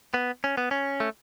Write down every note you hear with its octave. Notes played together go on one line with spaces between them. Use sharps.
B3
C#4
B3
C#4
A3